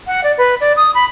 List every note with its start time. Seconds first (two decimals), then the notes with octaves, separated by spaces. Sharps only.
0.07 F#5
0.24 D5
0.38 B4
0.61 D5
0.76 D#6
0.95 B5